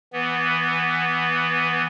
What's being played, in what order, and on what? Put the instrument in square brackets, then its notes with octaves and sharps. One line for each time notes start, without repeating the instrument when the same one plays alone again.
[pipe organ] E3 B3